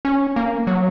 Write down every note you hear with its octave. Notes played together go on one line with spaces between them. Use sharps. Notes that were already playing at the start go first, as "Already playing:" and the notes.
C#4
A#3
F#3